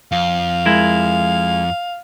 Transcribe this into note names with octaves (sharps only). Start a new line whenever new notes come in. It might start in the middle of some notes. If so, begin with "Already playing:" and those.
F2 F5
G#3 E4 A#4